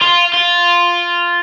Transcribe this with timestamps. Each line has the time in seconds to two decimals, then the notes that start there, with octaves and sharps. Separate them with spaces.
0.02 F4
0.33 F4